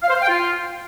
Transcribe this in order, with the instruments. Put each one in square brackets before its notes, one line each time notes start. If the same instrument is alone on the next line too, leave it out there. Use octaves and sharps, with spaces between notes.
[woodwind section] F5
C5
F5
G5
F4